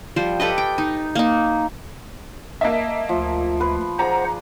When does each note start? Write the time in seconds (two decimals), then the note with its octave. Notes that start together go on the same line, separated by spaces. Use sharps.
0.16 F3 G3 C5
0.40 G4 A4 B4 D#5
0.58 G5
0.78 D#4
1.15 A#3 D#4
2.61 A#3 D#5 E5 A5
3.09 D2 F3
3.60 B4 C6
3.99 G#4 C5 D5 F#5 A#5